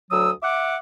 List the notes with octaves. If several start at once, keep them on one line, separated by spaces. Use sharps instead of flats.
D2 F#3 D#6 E6
E5 F#5 D6